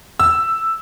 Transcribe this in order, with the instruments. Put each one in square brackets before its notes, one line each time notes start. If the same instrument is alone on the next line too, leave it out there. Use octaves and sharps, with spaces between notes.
[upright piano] E6